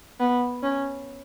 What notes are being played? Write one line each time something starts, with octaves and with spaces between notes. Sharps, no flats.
B3
C#4